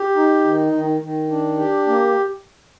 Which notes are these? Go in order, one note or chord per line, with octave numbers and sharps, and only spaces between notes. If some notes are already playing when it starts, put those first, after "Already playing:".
Already playing: G4
D#4
D#3
D#3
D#3
D4
G4
A#3